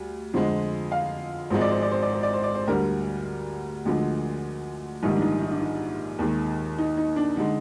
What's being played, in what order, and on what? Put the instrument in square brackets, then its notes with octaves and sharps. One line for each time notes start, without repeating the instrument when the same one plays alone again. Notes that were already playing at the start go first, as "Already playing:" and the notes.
Already playing: [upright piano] D2 G3
F2 D3 F3 G#3 C5
F5
G#1 G#2 F3 G#3 C5
D5
C5
D5
C5
D5
C5
D5
C5
D5
C5
D2 D3 G3 A#4
D2 D3 F3 G#3
A#1 G#2 D#3 G3 D#4
D4
D#4
D#4
D4
D#4
D#2 D#3 G#3
D#4
D#4
D4
D3 G#3 D#4